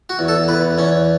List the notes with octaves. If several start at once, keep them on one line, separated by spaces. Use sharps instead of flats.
F#4
E2
A4
E2 B4
E2 C#4